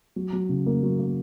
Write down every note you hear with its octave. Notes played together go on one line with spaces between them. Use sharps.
F#3
F#3
C#3
A#3
F#3
A#3